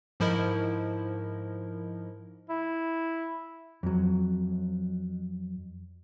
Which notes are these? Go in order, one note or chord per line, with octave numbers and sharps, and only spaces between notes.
G#2 F3 E4 A#4 D#5
E4
F2 F#3